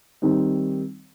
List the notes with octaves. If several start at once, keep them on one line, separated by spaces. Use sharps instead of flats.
D#3 G3 C4 D#4